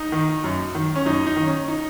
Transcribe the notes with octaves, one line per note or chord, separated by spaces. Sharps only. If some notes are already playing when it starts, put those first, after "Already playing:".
Already playing: D#4
D#3
F#2
D#3
C#4
F#2 D#4
D#4
D#3
C#4
D#4